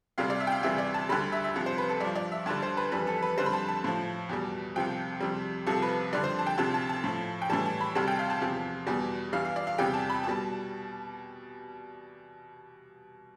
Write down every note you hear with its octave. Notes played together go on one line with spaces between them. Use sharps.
D2 C3 G3 F5
D5
E5
G5
F5
D2 C3 E3 G3 E5
D5
A5
D2 D3 G3 B5
E5
E5
C2 C3 F3
C5
B4
A4
G2 F3 D5
D5
E5
D2 D3 G3 A5
C5
B4
F2 E3 G3 B4
A4
B4
F2 D3 G3 C5
B5
A5
A5
A2 F3
E2 B2 G3
C2 C3 F3 G5
F2 C3 G3
C2 C3 F3 A4
B4
F2 D3 G3 D5
C5
A5
G5
D2 C3 F3 A5
A5
A5
A2 F3
G5
A2 E3 G3 A5
A5
B5
D2 C3 G3 A5
G5
F5
A5
E2 C3 F3
E2 B2 G3
G2 E3 G3 F5
F5
D5
F5
E2 C3 E3 G3 G5
A5
B5
B2 G3 A5